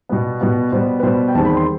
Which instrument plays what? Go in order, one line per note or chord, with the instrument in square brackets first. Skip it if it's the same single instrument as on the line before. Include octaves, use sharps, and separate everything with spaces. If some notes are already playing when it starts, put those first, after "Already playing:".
[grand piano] B2 G3 B3
B2 G3 B3
B2 G3 B3 C5
B4
B2 G3 B3 C5
G5
E2 D#3 G3 C4 A5
B5
C6